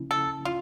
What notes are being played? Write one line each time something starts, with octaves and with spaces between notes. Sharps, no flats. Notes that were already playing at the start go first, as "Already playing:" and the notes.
Already playing: C#3 F3 A#3 C#4 E4
A4
F4